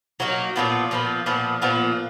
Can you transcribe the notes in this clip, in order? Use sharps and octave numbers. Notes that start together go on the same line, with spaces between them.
F#3 A#3 D#4
A#2 F3 B3
A#2 F3 B3
A#2 F3 B3
A#2 F3 B3